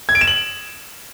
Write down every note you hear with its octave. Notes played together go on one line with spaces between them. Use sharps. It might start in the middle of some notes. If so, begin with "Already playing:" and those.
G#6
D7
E7
F#7